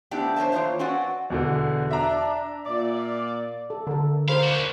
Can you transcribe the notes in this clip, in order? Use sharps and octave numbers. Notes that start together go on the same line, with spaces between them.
A3 B3 C4 D4 E4 G4
C5 C#5 D#5 E5 A5
E3 A#3 D#4 F4 C5 C#5
C4 C#4 F#4 B4 D5 F#5
E2 B2 D3
D4 E5 A#5
A#2 D5
A4
D3 A4 A#4
A#4 C5 F5 B5
D4 F#4